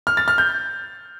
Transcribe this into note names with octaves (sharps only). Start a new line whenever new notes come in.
F6
A6
F6
G6